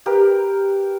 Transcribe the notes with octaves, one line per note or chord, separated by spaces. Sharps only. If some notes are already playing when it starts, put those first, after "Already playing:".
G4 A#4 B4